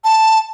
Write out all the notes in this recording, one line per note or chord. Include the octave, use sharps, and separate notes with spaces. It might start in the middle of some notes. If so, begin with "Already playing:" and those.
A5